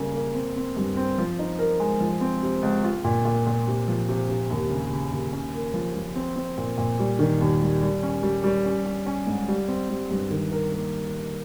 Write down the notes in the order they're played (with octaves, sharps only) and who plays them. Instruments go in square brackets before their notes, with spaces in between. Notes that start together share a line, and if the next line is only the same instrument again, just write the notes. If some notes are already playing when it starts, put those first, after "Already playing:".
Already playing: [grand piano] C#3 G3 A#3
A#3
C4
C4
G2
C4
F3
D#4
A#4
G#3
F3
C4
C3
C#2
F4
A#2
A#2
A#2
C3
F3
C3
C3
D#2
C#3
C#3
D#2
C#4
A#3
F3
F3
C4
C4
A#2
A#2
G3
D#3
D#2
G3
G3
C#4
G3
G3
C#4
C#4
C#4
G#2
G3
C4
G3
G2
D#3
A#4
A#3